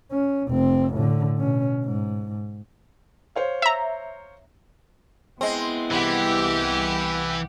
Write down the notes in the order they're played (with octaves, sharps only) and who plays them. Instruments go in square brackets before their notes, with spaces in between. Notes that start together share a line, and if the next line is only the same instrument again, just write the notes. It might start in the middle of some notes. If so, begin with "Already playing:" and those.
[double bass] C#4
F1 C4
A2 D3
B2 C#4
G#2
[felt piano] C5 C#5 F5
[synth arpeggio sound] E5 A#5
[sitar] G#3 C4 [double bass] B3 E4
[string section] C2 G4 F#5 [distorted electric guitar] E3